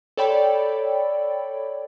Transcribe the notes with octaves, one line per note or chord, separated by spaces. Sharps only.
A4 C#5 D5 G5 B5